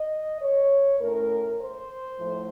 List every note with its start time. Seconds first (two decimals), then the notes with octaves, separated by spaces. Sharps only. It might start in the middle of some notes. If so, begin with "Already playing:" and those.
Already playing: D#5
0.42 C#5
1.00 A2 A3 C#4 A#4
1.59 C5
2.18 A2 F3 A3